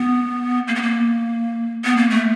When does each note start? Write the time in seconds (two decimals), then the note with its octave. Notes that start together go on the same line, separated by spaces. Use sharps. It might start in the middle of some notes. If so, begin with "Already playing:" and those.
Already playing: B3
0.68 A#3
0.75 B3
0.82 A#3
1.85 B3
1.97 A#3
2.10 A3